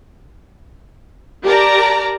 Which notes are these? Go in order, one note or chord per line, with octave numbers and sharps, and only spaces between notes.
G4 A#4 D5 A5 A#5